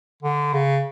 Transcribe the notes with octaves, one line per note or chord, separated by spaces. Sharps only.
D3
C#3